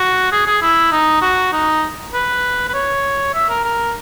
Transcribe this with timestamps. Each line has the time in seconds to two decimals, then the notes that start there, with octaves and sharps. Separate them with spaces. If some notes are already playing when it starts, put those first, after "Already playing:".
Already playing: F#4
0.32 G#4
0.47 G#4
0.62 E4
0.92 D#4
1.22 F#4
1.53 D#4
2.14 B4
2.69 B4
2.74 C#5
3.34 E5
3.49 A#4
3.64 A#4